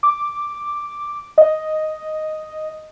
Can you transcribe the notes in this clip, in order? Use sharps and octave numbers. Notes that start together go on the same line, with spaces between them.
D6
D#5